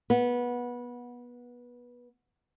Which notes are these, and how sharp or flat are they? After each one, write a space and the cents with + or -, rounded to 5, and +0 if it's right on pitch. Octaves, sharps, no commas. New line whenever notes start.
B3 -20